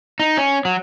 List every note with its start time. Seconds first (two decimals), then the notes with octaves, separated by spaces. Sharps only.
0.20 D#4
0.37 C#4
0.65 F#3